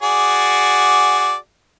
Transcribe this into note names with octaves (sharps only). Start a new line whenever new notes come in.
F#4 G#4 D5